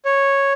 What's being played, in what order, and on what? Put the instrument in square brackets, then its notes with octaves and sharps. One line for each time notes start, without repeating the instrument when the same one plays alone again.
[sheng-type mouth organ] C#5